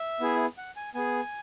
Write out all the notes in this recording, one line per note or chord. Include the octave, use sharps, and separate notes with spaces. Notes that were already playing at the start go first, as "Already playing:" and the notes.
Already playing: E5
B3 E4 G#4
F#5
G#5
B3 G#4 G#5